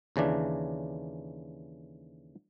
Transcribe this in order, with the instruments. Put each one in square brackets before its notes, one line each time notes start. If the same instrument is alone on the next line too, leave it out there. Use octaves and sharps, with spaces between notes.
[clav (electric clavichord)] D#2 C#3 E3 D4